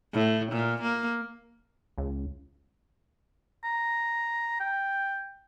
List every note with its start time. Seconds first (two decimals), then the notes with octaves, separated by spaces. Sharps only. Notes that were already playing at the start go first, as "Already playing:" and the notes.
0.13 A2
0.52 A#2
0.82 A#3
1.98 C#2
3.64 A#5
4.60 G5